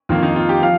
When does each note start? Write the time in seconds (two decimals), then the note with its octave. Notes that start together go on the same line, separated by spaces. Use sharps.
0.09 F2 D#3 A#3 F4
0.23 D#4
0.36 F4
0.49 G4
0.62 F3 F5